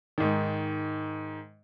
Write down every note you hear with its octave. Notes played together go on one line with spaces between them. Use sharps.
G#2 D#3